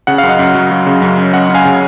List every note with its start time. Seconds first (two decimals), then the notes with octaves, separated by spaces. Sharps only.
0.07 C#3 F#5
0.18 F#2 F5
0.29 D#5 F#5
0.39 F#2
0.55 F#3
0.71 F#3
0.86 C#3
1.02 F#2
1.17 C#4
1.33 C#4 D#5 F#5
1.49 C#4
1.54 F5 G#5
1.65 C#3